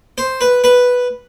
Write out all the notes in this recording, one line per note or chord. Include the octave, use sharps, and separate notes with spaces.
C5
B4
B4